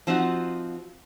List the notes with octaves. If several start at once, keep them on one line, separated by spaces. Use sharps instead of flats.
F3 C4 D#4 F#4